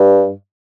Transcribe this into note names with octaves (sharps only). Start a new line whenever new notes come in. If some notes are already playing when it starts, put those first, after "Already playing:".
Already playing: G2